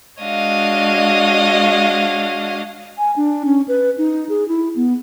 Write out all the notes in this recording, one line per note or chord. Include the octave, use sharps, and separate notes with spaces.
G#3 D4 F#4 C#5 D#5 F5
G#5
D4
C#4
B4
D#4
G#4
E4
B3